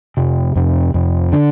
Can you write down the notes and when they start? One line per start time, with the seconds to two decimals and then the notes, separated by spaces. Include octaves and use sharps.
0.17 F2 C3
0.56 F2 C3
0.94 F2 C3
1.32 D3 D4